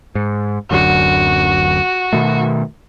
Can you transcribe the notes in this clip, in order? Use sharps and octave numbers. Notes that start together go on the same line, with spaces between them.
G#2
D1 F#2 D3 F#4
B2 D#3 A3